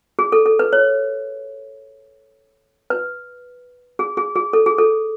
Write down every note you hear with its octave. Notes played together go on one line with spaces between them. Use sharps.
G#4
A4
A4
B4
C#5
B4
G#4
G#4
G#4
A4
G#4
A4